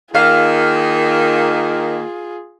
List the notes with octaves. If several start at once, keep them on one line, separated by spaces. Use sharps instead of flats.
D#3 A#3 F4 G#4 F5